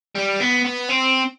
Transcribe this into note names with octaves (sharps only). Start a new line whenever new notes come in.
G3
B3
B3
C4